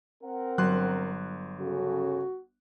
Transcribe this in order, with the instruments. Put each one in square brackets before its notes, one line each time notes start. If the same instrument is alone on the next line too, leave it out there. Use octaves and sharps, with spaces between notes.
[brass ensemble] C4 A#4 F#5
[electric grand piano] G1 C6 F#6 [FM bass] F#3
[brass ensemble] C#3 C#4 A4 [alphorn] F#4